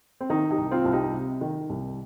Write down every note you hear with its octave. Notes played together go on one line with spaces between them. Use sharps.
C4
D#3 D#4
D#4 G4
C2
C4 F4
C2
D#4 G4
C3
D#3
C2